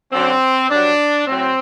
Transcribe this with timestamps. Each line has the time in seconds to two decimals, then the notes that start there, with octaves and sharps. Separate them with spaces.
0.12 F#2 D3 F#3 C4
0.70 G2 F#3 D4
1.27 A2 F#3 C4